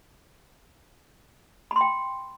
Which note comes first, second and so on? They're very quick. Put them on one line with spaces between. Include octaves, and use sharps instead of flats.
B5 C6 G5